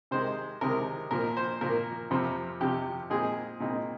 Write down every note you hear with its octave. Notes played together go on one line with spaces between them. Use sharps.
C3 D#3 G#3 C5
C3 D#3 G#3 A#4
A#2 F3 A#3 A#4
C5
A#2 F3 A#3 A#4
F2 C3 F3
F2 C3 F3 G4
A#2 G#3 C4 D#4 G#4
A#2 G#3 C4 D#4